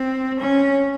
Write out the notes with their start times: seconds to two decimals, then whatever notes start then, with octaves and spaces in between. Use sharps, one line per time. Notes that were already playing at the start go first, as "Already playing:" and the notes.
Already playing: C4
0.40 C#4